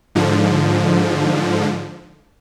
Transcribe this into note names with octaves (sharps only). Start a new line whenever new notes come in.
G#2 D3 F3